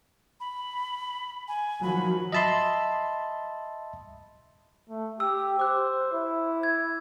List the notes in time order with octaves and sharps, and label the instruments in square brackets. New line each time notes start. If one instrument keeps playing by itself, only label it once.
[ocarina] B5
G#5
[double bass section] D#3 F3 F#3 [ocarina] B5
[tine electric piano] D#5 E5 A5 B5 C6
[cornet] A3
[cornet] G4 [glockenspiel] E6
[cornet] C5 [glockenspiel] D6 F#6
[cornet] E4
[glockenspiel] G#6